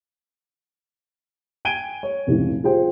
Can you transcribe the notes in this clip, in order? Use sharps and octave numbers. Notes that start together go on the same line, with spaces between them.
G5 G#5 G#6 D7 D#7 G7
C#5
F1 C#2 A2
F4 G#4 C5 G5